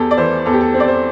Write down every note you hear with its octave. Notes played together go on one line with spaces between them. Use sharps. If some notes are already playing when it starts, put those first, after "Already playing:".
Already playing: E2 G4 A4
D5
E3 C5
E2 A4
G4
A4
C4
D5
C5